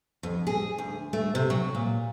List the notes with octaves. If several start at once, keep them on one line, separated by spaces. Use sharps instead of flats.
F2
G#4
D2
A3
C3
F#3
A#2